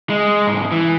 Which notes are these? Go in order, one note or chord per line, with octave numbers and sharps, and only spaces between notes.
G#3
C2 G#2
E3